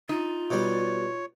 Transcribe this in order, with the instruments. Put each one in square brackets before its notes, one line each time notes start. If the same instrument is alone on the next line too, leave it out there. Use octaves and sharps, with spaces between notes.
[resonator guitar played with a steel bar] D#4 [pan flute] F4
[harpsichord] B2 G3 [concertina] C#5